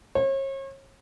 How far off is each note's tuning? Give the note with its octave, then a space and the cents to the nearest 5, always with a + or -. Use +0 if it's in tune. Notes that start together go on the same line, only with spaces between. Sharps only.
C#5 -40